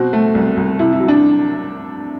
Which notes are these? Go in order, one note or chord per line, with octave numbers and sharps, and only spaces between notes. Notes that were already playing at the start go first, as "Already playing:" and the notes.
Already playing: B2 C4 F#4
A3
C2
C2
C3 E4
E4
F#3
D4